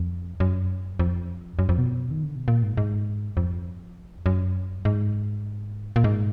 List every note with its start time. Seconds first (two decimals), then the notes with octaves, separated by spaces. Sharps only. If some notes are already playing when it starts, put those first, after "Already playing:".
Already playing: F2
0.40 F#2
0.99 F2
1.59 F#2
1.69 F2
1.78 B2
2.11 D#3
2.23 D3
2.36 B2
2.48 A#2
2.63 G#2
2.77 G#2
3.37 F2
4.26 F#2
4.85 G#2
5.96 A#2
6.04 G#2